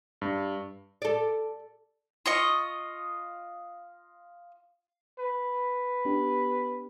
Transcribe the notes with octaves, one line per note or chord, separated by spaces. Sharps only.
G2
A4 D5
F4 D#5 C#6
B4
B3 D4 G4